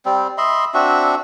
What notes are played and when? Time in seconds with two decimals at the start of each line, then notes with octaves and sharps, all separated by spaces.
0.05 G3 C4
0.38 D#5 E5 B5 C6
0.74 C4 D4 F#4 E5